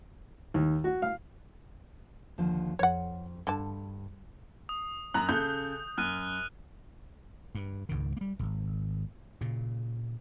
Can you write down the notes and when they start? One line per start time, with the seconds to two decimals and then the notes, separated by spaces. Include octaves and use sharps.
0.54 D#2
0.84 F#4
1.02 F5
2.38 D#2 D3 F3
2.79 F2 C#5 F#5
3.47 G2 D3 A5
4.69 D#6
5.14 F#2 A#5 F#6
5.29 C#3 A4 D#6 G6
5.98 F#2 F6 F#6 D#7
7.55 G2
7.89 C#2 G#2 D#3
8.17 G3 A#3
8.39 G#1 C#2
9.41 A#2 C#3